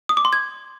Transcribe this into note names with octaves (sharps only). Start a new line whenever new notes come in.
D#6
D6
C6
G#6